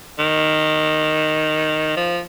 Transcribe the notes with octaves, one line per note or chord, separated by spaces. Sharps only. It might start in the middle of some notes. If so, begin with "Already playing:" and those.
D#3
F3